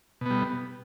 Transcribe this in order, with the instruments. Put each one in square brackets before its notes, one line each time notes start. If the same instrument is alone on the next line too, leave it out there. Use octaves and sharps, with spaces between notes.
[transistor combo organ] B2
B3
G3